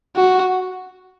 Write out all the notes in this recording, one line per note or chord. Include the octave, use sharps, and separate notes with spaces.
F#4